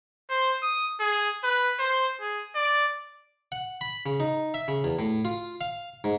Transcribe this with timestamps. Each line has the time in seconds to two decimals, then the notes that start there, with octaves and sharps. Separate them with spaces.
0.30 C5
0.63 D#6
1.00 G#4
1.43 B4
1.79 C5
2.21 G#4
2.55 D5
3.52 F#5
3.81 B5
4.06 C#3
4.20 D#4
4.54 E5
4.68 C#3
4.84 E2
4.99 A2
5.25 F4
5.61 F5
6.04 G#2